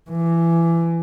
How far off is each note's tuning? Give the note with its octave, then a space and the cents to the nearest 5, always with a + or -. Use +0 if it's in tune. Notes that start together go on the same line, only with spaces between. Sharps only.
E3 +25